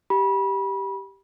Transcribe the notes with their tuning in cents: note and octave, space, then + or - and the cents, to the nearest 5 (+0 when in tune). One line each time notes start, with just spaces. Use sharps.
G4 +0 B5 -25